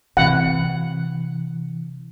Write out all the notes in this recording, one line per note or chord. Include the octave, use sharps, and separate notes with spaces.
C3 E3 F#5